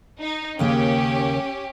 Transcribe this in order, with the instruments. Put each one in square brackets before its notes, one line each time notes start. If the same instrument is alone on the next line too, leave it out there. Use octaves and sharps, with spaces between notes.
[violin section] D#4
[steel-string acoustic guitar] D#2 C#3 A#3 [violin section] C#4 G4